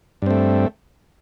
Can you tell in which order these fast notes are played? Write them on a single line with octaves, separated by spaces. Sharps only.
G2 C4 A3